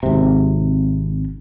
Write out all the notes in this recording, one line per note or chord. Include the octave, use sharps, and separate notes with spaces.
G#1 C3